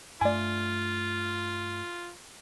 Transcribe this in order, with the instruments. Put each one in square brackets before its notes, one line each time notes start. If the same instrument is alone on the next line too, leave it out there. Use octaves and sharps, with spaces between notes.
[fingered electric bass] G2 A3 [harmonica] F4 [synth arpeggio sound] D5 G#5